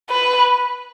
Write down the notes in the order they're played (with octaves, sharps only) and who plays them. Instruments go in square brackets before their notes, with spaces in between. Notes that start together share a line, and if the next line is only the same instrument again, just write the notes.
[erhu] B4